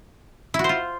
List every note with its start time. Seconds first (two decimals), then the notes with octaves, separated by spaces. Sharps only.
0.54 E4
0.59 F#4
0.64 C5
0.69 F4